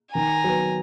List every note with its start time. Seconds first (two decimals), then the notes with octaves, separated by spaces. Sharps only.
0.14 D#3 G#5 A#5
0.44 F#3 B3